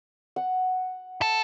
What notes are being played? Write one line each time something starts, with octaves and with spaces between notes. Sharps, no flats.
F#5
A4